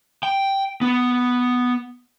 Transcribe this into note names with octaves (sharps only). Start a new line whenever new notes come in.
G5
B3